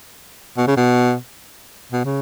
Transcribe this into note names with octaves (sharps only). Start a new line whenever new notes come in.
B2
C#3
B2
B2
C#3